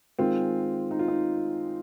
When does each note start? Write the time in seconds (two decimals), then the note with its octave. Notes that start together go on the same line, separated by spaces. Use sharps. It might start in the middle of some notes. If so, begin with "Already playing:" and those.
0.19 D#3 G#3 C4 F4
0.91 D#4
0.99 F4
1.08 D#4